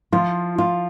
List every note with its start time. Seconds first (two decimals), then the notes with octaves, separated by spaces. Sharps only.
0.12 F3 F4
0.58 F4